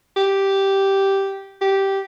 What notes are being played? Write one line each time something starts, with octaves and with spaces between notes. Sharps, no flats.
G4
G4